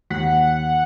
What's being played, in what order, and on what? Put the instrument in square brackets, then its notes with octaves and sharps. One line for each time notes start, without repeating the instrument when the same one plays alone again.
[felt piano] D#2 B6 [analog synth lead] F#5